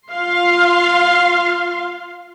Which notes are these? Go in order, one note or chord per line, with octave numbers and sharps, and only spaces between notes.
F4 F5 C6